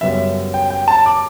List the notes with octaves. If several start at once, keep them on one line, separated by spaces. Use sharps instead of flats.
F#2 C#3 G3 B3 E5
G5
G5
A5
D6